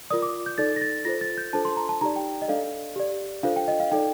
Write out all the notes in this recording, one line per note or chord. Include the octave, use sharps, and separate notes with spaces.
F4 A#4 D5 D#6
D6
G6
D#4 A4 D5 A6
A#6
A6
F4 A4 C5 A#6
A6
G6
D4 F4 A4 C5 A5
C6
A#5
A5
D#4 G4 D5 A#5
G5
D#5
D4 A4 D5 F5
G4 D5
D4 F4 A4 C5 F5
G5
D#5
F5
D#4 A4 D5 G5